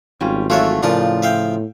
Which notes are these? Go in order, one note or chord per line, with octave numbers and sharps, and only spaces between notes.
G#1 G3 C#4 F4
E3 F#3 A3 F4 C#5 E5
A2 C#3 F3 D4 F4 A#4
E5 F5 G5